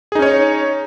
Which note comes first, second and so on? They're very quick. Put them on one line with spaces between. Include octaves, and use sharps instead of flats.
G#4 D#4 C#4 C#5